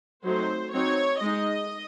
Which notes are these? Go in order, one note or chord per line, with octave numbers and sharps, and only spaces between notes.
F#3 A3 C4 D#4 C5
F#3 C4 D#4 C#5
G#3 D#4 D#5